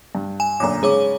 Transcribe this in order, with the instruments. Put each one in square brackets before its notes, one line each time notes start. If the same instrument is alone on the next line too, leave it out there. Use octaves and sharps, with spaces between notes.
[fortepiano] G2
[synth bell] G#5 E7
[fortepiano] F#2 A#2 D3 [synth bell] A#5 D6
[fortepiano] G#2 C#3 [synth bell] G#4 C#5 D6